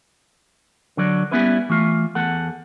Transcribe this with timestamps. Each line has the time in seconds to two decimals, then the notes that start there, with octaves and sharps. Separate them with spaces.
0.97 D3 F#3 D5
1.31 G3 B3 C#4 E4 B4
1.69 E3 A3 F4
2.15 E2 A4 F#5